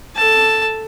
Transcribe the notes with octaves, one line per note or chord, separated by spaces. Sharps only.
A4 A5